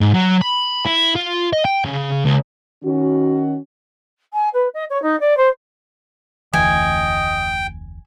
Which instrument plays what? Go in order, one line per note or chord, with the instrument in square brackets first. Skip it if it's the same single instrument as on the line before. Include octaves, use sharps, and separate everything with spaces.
[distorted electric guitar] G#2
F#3
B5
E4
F4
D#5
G5
C#3
C#2
[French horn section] D#3 C#4 F#4
[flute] G#5
B4
D#5
C#5
D#4
D5
C5
[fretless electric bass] F1 D2 E3 [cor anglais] D#5 [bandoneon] G5 [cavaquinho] G#5